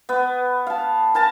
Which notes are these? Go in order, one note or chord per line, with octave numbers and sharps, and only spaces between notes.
B3
F5 A5
A#4 G#5 A5